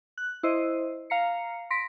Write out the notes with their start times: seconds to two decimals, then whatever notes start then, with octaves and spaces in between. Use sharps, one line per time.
0.18 F#6
0.43 E4 C5 D#5
1.10 F5 A#5 C7 C#7
1.70 C6 A#6 B6 D7